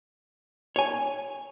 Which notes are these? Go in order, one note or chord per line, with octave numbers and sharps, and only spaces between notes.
C#5 G#5